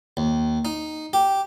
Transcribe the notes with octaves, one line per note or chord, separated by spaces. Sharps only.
D#2
D#4
G4